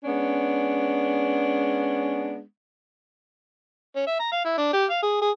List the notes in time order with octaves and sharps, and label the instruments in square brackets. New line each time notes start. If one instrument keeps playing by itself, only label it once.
[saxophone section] G#3 B3 C#4 D4
[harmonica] C#4
E5
A#5
F5
E4
D4
G4
F5
G#4
G#4